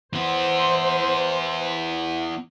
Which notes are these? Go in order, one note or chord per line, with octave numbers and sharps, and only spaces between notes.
E3 B3 C5